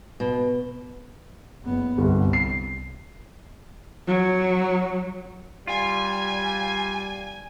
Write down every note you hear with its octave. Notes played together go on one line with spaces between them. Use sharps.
B2
F#1 B3
G1 C2
C7
F#3
G3 F4 G#5